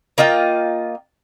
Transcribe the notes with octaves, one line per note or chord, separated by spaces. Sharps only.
A#3 F4 D#5 G5